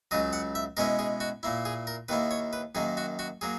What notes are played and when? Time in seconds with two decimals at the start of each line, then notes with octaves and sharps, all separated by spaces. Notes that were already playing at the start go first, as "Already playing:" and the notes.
0.11 C#2 C#3 F#3 D#5
0.33 F#5
0.55 E5
0.77 B2 G#3 C#4 E4 A#4
0.99 G#4
1.20 F#4
1.43 A#2 A#3 E4
1.65 G#4
1.87 A#4
2.08 D#2 D#3 A#3 E4 B4
2.31 C#5
2.53 B4
2.75 F#2 D#3 A#3 G#4
2.97 F#4
3.19 F#4
3.41 F#3 A#3 G#4